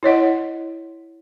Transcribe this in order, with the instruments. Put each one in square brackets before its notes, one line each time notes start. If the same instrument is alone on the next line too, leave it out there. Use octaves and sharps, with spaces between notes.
[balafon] E4 C#5 D#5 F#5